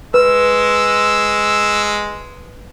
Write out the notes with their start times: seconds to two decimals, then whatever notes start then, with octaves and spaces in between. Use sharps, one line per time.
0.14 G#3 B4 E6